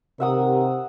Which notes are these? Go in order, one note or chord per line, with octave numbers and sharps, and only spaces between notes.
C3 D#3 G4 A#4 E5 F#5 D#6